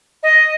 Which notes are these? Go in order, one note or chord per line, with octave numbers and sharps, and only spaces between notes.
D#5